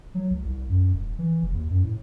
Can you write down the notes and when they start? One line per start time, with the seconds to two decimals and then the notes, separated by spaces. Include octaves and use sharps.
0.14 F#3
0.30 C#2
0.45 C2
0.69 F#2
0.93 D#1
1.18 E3
1.42 E1
1.54 D#2
1.70 F#2
1.83 A2